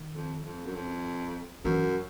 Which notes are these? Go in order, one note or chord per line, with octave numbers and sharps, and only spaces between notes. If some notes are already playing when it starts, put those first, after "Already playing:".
Already playing: D#3
F2
F2
F#2
F2
F#2 E3